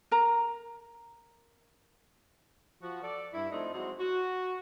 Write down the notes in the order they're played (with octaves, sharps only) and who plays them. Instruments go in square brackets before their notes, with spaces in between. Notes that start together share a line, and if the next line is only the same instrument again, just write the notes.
[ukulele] A#4 A#5
[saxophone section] F3 F#4
A4 D5
G2 E4
F3 A3 C4 D4 D#4
F#3 G#3 C4 E4 F#4
F#4